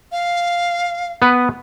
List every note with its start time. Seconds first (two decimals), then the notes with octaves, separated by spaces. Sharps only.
0.12 F5
1.22 B3 B4